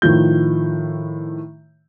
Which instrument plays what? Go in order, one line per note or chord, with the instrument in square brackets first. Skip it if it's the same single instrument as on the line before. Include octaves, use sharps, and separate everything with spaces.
[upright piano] A2 D#3 F3 G6